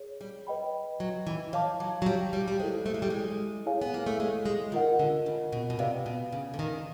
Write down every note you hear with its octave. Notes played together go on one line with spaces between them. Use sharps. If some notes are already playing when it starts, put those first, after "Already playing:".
Already playing: G#4 C#5
G3
B4 D#5 G5 B5
F#3
E3
F3 C#5 F5 A5 D6
F#3
F#3
G3
G3
G3
G#3 E4 A4 C5
A3
G#3
G3
G#3
E4 G#4 C#5 F5 G#5
B3
A#3
A3
G#3
G#3
D#3 F4 A#4 D#5 F#5
D3
C#3
B2
B2
C3 B4 D5 F5
B2
C#3
D3
D#3